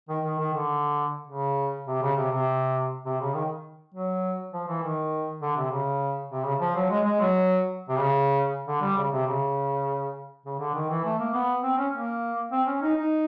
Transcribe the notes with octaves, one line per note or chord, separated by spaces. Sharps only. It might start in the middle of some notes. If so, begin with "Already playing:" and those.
D#3
D#3
D#3
D3
C#3
C3
C#3
C3
C3
C3
C#3
D#3
F#3
F3
E3
D#3
D3
C3
C#3
C3
C#3
F3
F#3
G#3
G#3
F#3
C3
C#3
D3
G3
C#3
C3
C#3
C#3
D3
D#3
E3
A3
A#3
B3
C4
C#4
A#3
C4
C#4
D#4
D#4